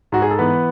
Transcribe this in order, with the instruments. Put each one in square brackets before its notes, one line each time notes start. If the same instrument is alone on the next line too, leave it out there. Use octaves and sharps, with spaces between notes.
[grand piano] G#2 F#4
G#4
A4
E3 B3 B4